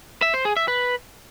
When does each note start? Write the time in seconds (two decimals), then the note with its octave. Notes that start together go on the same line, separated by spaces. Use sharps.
0.22 E5
0.34 C5
0.45 G#4
0.57 E5
0.68 B4